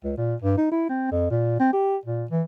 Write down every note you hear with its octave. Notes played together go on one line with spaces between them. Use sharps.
C#2
A#2
G2
D#4
E4
C4
F2
A#2
C4
G4
A#2
E3